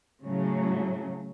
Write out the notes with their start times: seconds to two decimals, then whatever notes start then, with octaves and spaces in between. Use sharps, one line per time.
0.20 A2 C#3 F#3